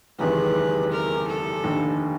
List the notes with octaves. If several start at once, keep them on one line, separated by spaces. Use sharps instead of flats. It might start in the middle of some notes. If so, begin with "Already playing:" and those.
F#1 E2 C3 D#3 G#3 B4
A#4
A4
F1 D#2 D3